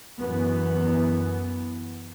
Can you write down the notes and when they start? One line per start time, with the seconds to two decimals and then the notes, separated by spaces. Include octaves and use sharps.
0.20 F#2 E3 B3